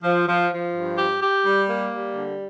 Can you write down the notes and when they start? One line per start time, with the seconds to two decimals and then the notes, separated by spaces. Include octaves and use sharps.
0.03 F3
0.28 F3
0.51 F3
0.74 G2
0.97 G4
1.22 G4
1.45 G3
1.68 A#3
1.92 G3
2.15 D3